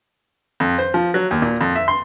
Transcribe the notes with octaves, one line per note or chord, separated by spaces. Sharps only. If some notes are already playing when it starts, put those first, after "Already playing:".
F2
C5
F3
F#3
D#2
A#2
F2
E5
C6